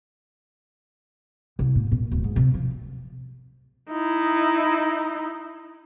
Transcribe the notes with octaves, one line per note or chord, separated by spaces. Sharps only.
C2
A2
A#2
D1
G#2
C3
F3
D#4 E4